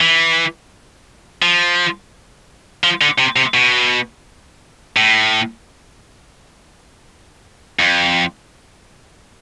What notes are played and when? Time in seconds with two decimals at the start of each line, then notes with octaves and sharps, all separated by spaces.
0.01 E3
1.42 F3
2.84 F3
3.01 D3
3.19 C3
3.36 C3
3.54 B2
4.96 A2
7.79 F2